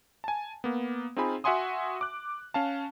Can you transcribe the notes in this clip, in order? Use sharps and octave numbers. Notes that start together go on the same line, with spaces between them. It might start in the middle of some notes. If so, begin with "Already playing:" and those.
G#5 A5
A#3 B3
C4 D#4 F4 G#4 G#5 B5
F#4 E5 F#5 G#5 C6 D#6
D6 F#6
C#4 F5 A5